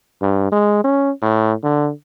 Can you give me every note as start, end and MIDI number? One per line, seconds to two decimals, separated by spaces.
0.22 0.49 43
0.52 0.80 56
0.84 1.11 61
1.22 1.53 45
1.64 1.91 50